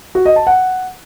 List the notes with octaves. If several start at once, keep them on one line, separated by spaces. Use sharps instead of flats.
F#4
D#5
A5
F#5